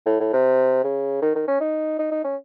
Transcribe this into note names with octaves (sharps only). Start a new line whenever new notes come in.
A2
A2
C3
C#3
D#3
D#3
C#4
D#4
D#4
D#4
C#4